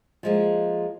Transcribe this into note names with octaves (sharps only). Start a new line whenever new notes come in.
F3 G#3 A#3